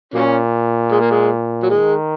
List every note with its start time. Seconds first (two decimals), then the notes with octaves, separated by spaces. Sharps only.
0.14 A#2 F#3 A#3 C#4
0.92 G#3
1.01 A#3
1.11 G#3
1.63 F#3
1.70 D#3 G#3